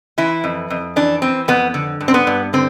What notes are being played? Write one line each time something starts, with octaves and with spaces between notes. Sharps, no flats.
E3 E4
F2
F2
E3 D4
E3 C4
F2 B3
D3
G2
C4
B3
G2
D3 C4